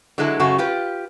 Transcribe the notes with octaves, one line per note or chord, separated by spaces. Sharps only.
D3 F#3 G#3 E4 A4
F#2 C#3 A3 C#4 F#4
F4 G4 B4